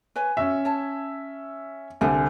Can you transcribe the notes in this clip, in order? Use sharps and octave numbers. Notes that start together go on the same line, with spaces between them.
B4 C#5 G#5
C#4 F#4 E5
C#5 A5
C2 D3 D4 C5 G#5